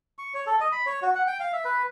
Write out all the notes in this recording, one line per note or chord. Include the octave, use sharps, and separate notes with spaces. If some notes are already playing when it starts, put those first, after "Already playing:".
C#6
C#5
A4
D#5
B5
C#5
F#4
F#5
G5
F5
E5
B4